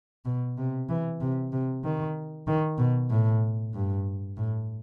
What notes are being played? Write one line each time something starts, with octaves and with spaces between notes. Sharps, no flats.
B2
C3
E3
C3
C3
D#3
D#3
B2
A2
G2
A2